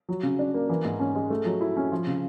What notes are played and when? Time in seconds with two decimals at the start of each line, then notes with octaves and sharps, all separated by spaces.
0.09 F#3
0.23 C#3
0.39 D4
0.54 A#3
0.69 E3
0.85 G#2
1.00 C#4
1.15 G#3
1.30 A3
1.46 F#3
1.61 E4
1.76 C#4
1.92 F3
2.07 C#3